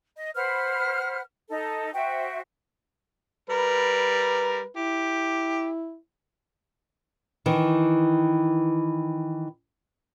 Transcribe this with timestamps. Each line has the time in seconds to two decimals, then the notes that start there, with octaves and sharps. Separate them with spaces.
0.16 D#5
0.35 B4 C5 F#5 F6
1.50 D#4 A4 D#5
1.94 F#4 C5 E5 G5
3.50 G3 A#4 B4
4.77 E4 G4
7.46 D#3 E3